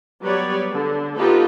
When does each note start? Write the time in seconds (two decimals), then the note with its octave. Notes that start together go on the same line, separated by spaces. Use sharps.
0.22 F#3 G3 B3 B4 C#5 D5
0.72 D3
1.15 B3 D#4 F4 G4 A4 B4